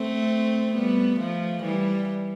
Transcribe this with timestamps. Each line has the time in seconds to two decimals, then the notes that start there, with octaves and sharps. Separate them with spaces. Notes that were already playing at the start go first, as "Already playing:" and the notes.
Already playing: A3 C4
0.74 G3 B3
1.19 F3 A3
1.63 E3 G3